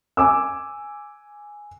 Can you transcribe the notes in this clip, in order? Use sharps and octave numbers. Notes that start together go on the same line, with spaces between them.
G#5 D6 E6